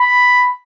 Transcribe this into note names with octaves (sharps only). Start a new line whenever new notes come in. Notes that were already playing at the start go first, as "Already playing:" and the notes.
Already playing: B5